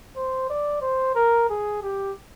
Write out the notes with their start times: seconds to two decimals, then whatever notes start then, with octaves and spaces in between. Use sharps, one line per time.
0.16 C5
0.50 D5
0.82 C5
1.15 A#4
1.49 G#4
1.83 G4